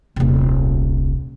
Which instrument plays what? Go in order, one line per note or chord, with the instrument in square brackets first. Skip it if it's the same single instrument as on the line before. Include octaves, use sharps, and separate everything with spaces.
[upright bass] D#1 C2